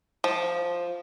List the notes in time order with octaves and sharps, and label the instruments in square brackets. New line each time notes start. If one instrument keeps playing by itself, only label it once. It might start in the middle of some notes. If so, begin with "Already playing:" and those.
[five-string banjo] F3